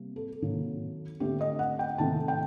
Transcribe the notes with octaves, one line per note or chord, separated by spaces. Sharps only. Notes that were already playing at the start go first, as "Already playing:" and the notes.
Already playing: C3 G3 A#3
A4
C3 D#3 F#3 A#3
D3 A3 C4 G4
D#5
F#5
G5
C3 D#3 A3 C4 A5
G5